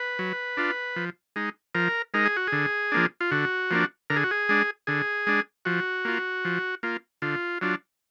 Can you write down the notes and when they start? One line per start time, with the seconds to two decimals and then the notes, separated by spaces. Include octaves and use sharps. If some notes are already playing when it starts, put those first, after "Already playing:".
Already playing: B4
0.19 F#3
0.57 D4 F4
0.96 F3
1.36 G#3 D#4
1.75 F3 A#4
2.14 G#3 D#4 A#4
2.26 G#4
2.37 F#4
2.47 D3 G#4
2.92 F3 A#3 D4
3.21 F4
3.31 D3 F#4
3.71 F3 A#3 D4
4.10 D3 A#4
4.16 G#4
4.24 F#4
4.31 G#4
4.49 G#3 D4
4.87 D3 G#4
5.27 G#3 D4
5.65 F3 F#4
6.05 A#3 F4
6.45 F3
6.83 A#3 F4
7.22 D3 F4
7.61 F#3 D4 F4